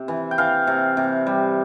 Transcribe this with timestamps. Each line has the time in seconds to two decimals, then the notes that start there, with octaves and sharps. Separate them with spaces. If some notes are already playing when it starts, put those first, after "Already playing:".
Already playing: C3
0.08 E3
0.31 G5
0.38 E3 F5
0.67 C3
0.97 C3
1.27 G3